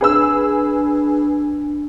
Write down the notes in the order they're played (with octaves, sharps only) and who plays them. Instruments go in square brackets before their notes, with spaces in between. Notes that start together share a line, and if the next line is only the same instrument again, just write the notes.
[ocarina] D4 [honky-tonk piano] G#4 B4 E6